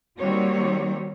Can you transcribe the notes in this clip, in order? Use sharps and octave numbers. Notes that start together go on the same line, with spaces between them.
D#3 G3 A#3 C4 F#4 C#5